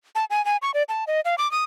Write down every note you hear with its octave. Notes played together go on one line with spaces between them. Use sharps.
A5
G#5
G#5
C#6
D5
A5
D#5
F5
D6
D#6